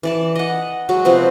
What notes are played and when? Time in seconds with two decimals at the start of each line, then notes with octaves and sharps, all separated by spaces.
0.03 E3 D5 A5
0.35 D#5 F#5
0.89 F#3 G#3 F#4
1.05 C3 F3 B3 C4